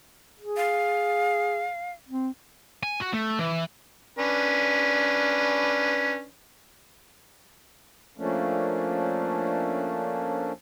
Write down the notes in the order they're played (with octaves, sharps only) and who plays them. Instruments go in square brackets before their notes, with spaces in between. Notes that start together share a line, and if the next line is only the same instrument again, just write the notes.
[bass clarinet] G#4
[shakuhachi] F5
[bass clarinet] C4
[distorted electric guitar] G#5
F#4
A3
E3
[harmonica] C#4 D4 B4
[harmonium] F3 A3 A#3 C#4 D4